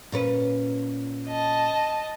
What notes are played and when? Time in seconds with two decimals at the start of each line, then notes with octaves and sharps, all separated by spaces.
0.12 A#2 C#4 B4
1.28 D#5 A5